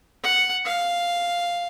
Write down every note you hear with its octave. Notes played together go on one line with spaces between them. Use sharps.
F#5
F5